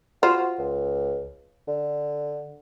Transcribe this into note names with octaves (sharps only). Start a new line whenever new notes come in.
F4 F#4 C5
C#2
D3